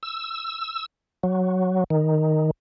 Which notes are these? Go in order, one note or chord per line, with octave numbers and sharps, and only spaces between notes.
E6
F#3
D#3